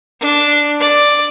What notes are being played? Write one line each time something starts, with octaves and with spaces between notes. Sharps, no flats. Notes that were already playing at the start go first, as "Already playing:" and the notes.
D4
D5